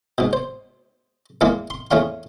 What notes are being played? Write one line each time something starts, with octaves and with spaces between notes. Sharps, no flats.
G#2 B2
C5
E2 E3 G#3 A#3
C6
E2 A3 C#4 F5 C6